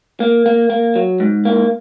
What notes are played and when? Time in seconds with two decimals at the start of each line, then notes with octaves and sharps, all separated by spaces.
0.20 A#3
0.46 A#3
0.70 A#3
0.96 F#3
1.20 G#2
1.45 A#3